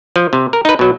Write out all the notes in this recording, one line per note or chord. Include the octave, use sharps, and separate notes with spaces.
F3
C3
A#4
D#4 B4
B2 F#3